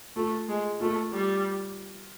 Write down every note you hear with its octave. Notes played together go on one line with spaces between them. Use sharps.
A3 F4
G#3
A3 F4
G3